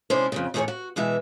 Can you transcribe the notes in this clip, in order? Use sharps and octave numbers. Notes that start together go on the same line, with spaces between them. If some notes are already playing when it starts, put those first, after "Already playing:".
C3 G#3 C#4 D4 E4 C5
F2 A2 C#3
E2 A2 D#3 D#4 G#4 C#5
F#4
B2 E3 G#3 E5